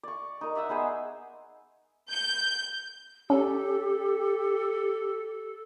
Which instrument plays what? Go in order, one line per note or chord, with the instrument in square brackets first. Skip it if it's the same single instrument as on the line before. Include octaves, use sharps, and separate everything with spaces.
[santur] D5 C#6
D#4 A#4
D5 E5 F#5 E6
B3 D#4 G#4 C5
[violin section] G6
[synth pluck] C#4 [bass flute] G4 [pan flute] A4